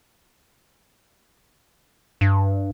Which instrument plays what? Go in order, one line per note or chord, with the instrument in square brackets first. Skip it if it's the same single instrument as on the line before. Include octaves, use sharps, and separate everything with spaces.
[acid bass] G2